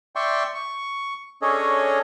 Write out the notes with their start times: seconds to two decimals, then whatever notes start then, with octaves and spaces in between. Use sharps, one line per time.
0.16 D5 E5 G5 C6 C#6
0.55 C#6
1.42 C#4 D4 G#4 A4 C#5 D#5